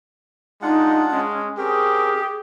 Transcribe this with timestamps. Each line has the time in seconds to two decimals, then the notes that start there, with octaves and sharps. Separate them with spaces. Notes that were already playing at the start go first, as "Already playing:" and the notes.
0.62 G#3 D4 D#4 F4 F#5
1.11 G#3 C#4
1.58 C4 C#4 G4 G#4 A#4